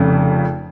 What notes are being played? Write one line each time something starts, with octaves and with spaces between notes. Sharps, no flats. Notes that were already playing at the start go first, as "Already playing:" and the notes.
Already playing: F1 F2 C#3